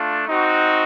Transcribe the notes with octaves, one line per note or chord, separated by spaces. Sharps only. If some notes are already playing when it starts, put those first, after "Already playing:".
Already playing: A3 D4 F4
C4 D#4 F#4